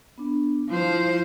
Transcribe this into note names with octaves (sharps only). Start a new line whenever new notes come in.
B3 D4
F3 E4 C5